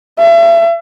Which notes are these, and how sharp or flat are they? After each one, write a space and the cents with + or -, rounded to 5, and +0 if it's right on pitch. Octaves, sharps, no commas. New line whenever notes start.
E5 +35